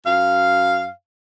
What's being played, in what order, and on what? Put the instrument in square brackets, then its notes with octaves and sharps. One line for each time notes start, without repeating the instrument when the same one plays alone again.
[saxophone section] F#2 F5